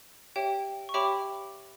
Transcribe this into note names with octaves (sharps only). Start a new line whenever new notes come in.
G4 C#5 E5 G5
C#6
G4 C#5 E5 G5 B5 D6